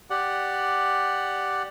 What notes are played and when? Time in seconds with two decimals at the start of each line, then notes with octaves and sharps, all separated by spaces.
0.10 G4 D5 F#5